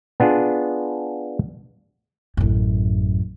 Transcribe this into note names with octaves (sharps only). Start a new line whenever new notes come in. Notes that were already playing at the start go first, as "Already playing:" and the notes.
B3 D4 F4 G#4
A1 F#2